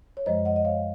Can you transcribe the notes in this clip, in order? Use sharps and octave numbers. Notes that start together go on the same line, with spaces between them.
C#5
F#2 F3 G#3 C5 D#5
D#5 F#5
D#5
C#5 F5